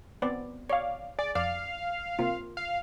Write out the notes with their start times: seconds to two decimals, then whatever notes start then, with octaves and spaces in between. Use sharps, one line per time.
0.22 B3 C4 D5
0.70 C#5 D5 F5
1.19 G#4 D5
1.35 F2 D5 F5
2.19 C3 A#3 F4
2.57 F5